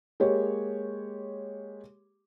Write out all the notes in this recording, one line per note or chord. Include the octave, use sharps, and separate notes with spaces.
G#3 A#3 G4 C#5